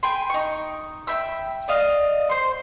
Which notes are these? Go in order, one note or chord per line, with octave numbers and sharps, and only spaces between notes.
G5 G#5 B5 C6
D#4 C#6
E5 G5 B5 E6
D5 D#5 F5
C5 C6